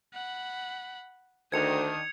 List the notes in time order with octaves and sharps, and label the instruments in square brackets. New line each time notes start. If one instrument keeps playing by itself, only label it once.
[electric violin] F#5 B5
[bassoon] D2 [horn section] D#3 D4 [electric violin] C5 D#6 [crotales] G#6 C#7 F7